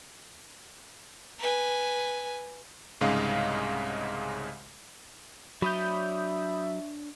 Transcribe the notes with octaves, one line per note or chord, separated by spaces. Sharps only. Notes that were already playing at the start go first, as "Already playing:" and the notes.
B4 G#5
C2 G#2 C#3 G#3 D#5 F5
F#3 D4 C#5 E5 B5 D#6 G6